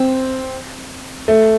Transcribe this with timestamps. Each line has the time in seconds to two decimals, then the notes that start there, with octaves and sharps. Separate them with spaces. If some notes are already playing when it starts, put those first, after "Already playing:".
Already playing: C4
1.28 A3